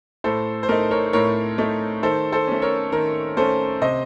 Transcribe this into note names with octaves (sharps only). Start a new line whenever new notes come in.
A2 A4 C5
C5
A3 D#4 A#4
A#4 C#5
A2 A#4 C#5
A3 D#4
D#3 A4 C5
A4 C5
A3 C#4
A#4 C#5
D#3 A#4
A3 C#4 A4 C5
C3 C5 D#5